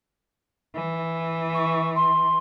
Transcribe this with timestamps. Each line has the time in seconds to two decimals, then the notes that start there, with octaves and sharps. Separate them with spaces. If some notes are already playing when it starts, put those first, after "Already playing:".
0.75 E3
1.54 C#6
1.95 C6